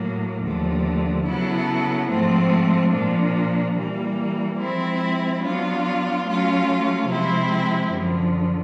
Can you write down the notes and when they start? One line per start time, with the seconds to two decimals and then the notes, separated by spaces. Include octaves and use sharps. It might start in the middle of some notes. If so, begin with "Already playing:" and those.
Already playing: A2 F#3 A#3
0.43 D#2 D3 F3 A3
1.26 C#3 F#3 B3 E4 A4
2.09 G#2 F3 A3 C4
2.92 A#2 F3 A#3 D4
3.75 E3 G3 A#3
4.59 F3 G#3 C4 E4
5.41 F#3 B3 D4 F4
6.25 F#3 A3 C#4 F4
7.07 C3 F3 G#3 C4 E4
7.91 F#2 D3 F3